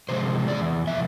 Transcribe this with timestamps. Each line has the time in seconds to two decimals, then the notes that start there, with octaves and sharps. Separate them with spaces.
0.09 C3 F3 G#3 C5
0.48 E2 D5
0.87 C3 F3 E5